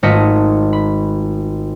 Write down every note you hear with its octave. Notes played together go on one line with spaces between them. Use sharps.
G#1 A3 F4 D#5 B6 C#7
B5